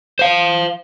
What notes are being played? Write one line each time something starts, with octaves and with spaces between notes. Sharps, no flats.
C5 F5